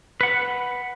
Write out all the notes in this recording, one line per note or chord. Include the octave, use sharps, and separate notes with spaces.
B4 F#5